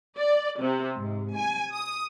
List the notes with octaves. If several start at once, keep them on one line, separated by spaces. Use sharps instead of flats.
D5
C3
G#2
G#5
D#6